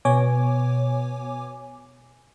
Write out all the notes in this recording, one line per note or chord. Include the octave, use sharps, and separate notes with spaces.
B2 B3 C#5 G#5 D6